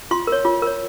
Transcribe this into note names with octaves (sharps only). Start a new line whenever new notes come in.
F4 C6
A#4 C#5
F4
A#4 C#5